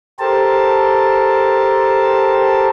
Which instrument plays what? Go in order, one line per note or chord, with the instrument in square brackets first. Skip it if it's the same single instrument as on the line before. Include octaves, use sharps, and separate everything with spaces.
[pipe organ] G4 A4 A#4 C5 A5